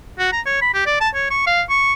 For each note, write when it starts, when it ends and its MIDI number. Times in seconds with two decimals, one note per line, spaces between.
0.19 0.30 66
0.32 0.41 82
0.46 0.60 73
0.62 0.70 83
0.74 0.83 67
0.86 0.98 74
1.00 1.09 81
1.14 1.26 73
1.30 1.43 85
1.47 1.62 77
1.70 1.94 85